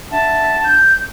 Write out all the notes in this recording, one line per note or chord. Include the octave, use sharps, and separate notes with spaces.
D4 E5 F#5 A5
G6